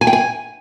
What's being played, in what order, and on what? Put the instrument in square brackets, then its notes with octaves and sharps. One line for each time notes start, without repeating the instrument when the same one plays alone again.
[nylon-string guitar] G#5
G5
G#5